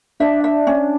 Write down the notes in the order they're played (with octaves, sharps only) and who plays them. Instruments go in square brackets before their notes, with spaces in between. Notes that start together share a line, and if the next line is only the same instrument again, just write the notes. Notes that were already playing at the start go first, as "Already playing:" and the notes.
[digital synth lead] D4 [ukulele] E5
[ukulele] E5
C#4